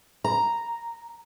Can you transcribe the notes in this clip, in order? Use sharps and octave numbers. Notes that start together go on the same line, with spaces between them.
A#5